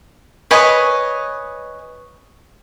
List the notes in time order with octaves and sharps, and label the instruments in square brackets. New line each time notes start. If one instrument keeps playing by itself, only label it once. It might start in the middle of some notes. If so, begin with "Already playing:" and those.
[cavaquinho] B4 C#5 D#5 G#5